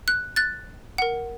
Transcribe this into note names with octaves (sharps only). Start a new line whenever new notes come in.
F#6
F#6 A6
A#4 F#5